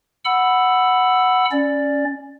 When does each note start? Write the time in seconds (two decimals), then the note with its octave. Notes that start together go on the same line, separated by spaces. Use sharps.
0.25 F#5 B5 E6
1.51 C#4 D5